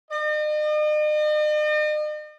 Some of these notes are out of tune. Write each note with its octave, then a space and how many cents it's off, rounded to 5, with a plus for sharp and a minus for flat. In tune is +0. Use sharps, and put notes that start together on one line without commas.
D#5 -45